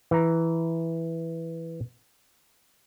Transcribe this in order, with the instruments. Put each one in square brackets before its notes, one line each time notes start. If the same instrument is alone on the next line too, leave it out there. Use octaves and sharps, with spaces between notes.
[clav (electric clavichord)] E3 A#5